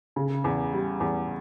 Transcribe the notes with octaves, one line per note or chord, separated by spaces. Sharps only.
C#3
E2
G3
E2